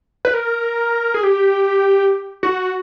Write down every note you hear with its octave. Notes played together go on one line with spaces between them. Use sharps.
B4
A#4
G#4
G4
F#4